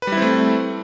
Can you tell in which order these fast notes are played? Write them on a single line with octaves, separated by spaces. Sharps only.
B4 G3 E4 C4 A3